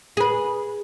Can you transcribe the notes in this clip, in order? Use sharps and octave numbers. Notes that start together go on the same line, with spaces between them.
G#4 B4